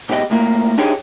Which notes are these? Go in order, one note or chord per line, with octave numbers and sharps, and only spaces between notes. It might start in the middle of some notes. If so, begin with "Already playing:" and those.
G#2 B2 G4 C#5 D#5
C2 A2 A#3
D4 D#4 G4 G#4 C#5